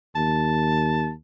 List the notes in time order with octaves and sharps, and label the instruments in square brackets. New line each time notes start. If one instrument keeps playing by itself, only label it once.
[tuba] D#2 [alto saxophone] A5